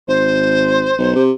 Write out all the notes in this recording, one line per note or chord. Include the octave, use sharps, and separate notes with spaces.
G#1 C5
B1
C3